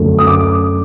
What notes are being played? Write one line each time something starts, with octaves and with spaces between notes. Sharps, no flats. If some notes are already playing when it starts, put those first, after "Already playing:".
Already playing: F#2 D3 A3
D#6
D6